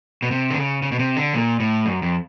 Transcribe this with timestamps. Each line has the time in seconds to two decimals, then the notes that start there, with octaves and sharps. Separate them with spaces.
0.22 B2
0.31 C3
0.50 D3
0.57 C#3
0.82 C#3
0.92 B2
0.99 C3
1.17 D3
1.34 A#2
1.60 A2
1.86 F#2
2.02 F2